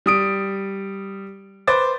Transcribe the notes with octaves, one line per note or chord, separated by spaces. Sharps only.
G3 D#6 D7
B4 C5 D6 A6